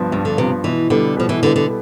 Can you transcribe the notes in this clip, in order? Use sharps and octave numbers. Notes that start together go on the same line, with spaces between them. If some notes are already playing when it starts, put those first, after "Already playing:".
Already playing: G2 F3 B3
G2 G3
D3
C3 F3 B3
B2 E3
D3 G3 B3
B2 F3
E3
D3 G3 B3
D3